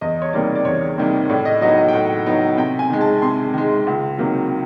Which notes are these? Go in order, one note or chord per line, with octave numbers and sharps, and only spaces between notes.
E2 D#5
C#5
C3 D#3 G3 A#3 D5
D5
E2 C#5
C3 D#3 G3 A#3
A2 D5
D#5
F#3 B3 D#4 D#5
D#5
G5
A2 F#5
F#3 B3 D#4
C3 G5
G#5
D#3 G#3
A5
C3 C6
D#3 G#3
C#2
C3 D#3 F#3 A#3